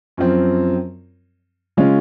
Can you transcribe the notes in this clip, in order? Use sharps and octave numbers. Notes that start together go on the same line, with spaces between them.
F#2 F3 C4
C#3 G#3 C#4 F4